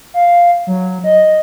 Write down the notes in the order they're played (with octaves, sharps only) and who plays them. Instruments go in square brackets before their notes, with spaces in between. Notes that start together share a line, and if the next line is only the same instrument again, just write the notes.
[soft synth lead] F5
F#3
D#5